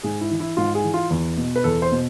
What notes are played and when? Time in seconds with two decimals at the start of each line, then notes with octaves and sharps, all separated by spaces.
0.03 G#2 G#4
0.21 E4
0.31 E3
0.40 E4
0.57 G#2 F4
0.75 G#4
0.84 E3
0.94 F4
1.10 E2
1.37 B2
1.56 B4
1.64 E2 A4
1.82 C5
1.91 B2